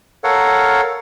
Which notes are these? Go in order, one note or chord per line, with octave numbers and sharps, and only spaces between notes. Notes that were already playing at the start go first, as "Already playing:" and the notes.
A4 A#4 C#5 F5 F#5